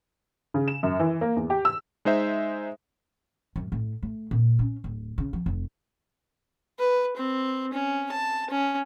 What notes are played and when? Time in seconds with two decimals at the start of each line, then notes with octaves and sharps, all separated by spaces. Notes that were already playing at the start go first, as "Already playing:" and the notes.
0.54 C#3
0.68 E7
0.83 F#2
0.99 E3
1.21 A#3
1.36 E2
1.50 G4
1.65 E6
2.05 G#3 D#4 C5 E5
3.56 F#2
3.72 A2
4.02 A3
4.31 A#2
4.59 C#4
4.84 D1
5.18 C#3
5.33 F3
5.46 F1
6.79 B4
7.17 C4
7.73 C#4
8.12 A5
8.50 C#4